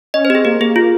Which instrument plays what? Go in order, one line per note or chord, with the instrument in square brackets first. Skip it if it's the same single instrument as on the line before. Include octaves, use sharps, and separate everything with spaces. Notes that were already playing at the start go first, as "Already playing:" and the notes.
[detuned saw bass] C#4 [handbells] D#5
[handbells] C5
[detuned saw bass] C4 [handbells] G4
[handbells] G#4
[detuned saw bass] A#3 [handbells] G4
[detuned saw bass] A#3 [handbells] G#4
[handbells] F4